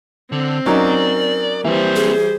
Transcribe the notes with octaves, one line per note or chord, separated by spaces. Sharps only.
D3 C4
F#3 C#4 D#4 A#4 D5
E3 G3 A#3 C4 C5
G#4